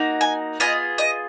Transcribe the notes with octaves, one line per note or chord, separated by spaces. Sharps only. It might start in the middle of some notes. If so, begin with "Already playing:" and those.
Already playing: A#3 D#4 F#4
G#5
B3 F4 G#4 D#5
D#5